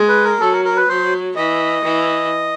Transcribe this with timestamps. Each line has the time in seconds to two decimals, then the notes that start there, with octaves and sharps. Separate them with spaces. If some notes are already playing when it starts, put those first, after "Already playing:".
Already playing: G#3
0.08 B4
0.25 A#4
0.40 F#3 A4
0.52 A#4
0.65 A#4
0.76 B4
0.89 F#3 C5
1.36 E3 D#5
1.84 E3